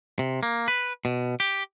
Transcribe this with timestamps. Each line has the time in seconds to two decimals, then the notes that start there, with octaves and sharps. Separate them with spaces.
0.19 C3
0.43 A#3
0.68 B4
1.05 B2
1.40 G4